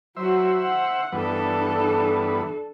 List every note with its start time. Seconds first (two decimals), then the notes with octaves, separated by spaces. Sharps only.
0.17 F#3 F#4 C5 E5
0.62 F#5
1.12 G2 E3 B3 D4 A4